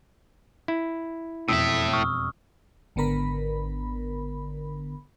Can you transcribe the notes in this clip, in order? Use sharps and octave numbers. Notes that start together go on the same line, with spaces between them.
E4
E1 F2 A2 E5 D#6 E6
C#6 D#6 F6
G#1 D3 B3 A#4 B5